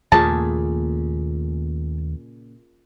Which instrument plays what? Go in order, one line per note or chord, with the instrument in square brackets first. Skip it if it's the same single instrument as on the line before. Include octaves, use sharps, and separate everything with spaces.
[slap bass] D#2 A3 [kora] A#2 C#3 G#4 [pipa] A5